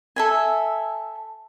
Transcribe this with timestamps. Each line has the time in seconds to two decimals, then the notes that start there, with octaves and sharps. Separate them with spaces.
0.16 A4 E5 G#5